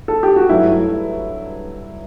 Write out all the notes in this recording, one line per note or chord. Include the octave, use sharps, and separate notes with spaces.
A4
G4
F#4
G2 F#3 A3 E4